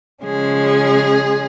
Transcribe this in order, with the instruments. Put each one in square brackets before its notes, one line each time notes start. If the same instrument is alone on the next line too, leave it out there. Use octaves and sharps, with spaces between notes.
[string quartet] C#3 F3 G#3 C#4 G#4